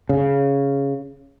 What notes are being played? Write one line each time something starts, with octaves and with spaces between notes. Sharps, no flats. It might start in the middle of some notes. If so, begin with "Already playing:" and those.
C#3